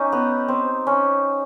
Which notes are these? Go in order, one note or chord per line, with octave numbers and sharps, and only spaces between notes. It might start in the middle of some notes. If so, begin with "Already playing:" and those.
Already playing: C#4 D#4 G4
B3
C4
C#4